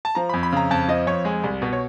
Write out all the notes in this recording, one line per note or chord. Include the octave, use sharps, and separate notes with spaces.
A5
F3 A#5
F2 B5
B5
C#3 A#5
F2 A5
F3 D#5
F2 C#5
G#3
C2
B2
C#5